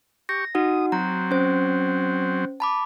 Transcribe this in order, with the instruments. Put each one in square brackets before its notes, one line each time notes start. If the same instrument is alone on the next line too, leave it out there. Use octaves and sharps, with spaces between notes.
[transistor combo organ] G4 C#6 [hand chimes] A#6
[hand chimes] D#4 F#4 F#5 [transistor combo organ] D#6
[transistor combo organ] F#3 C4 [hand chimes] A#5
[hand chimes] C#4 C5
A5 B5 D6